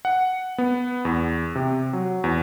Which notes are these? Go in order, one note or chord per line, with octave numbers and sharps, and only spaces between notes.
F#5
B3
E2
C3
F#3
E2